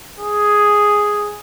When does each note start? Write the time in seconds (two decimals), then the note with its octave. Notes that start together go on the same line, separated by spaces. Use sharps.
0.19 G#4